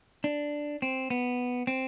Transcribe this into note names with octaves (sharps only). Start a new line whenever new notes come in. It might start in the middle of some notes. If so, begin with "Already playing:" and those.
D4
C4
B3
C4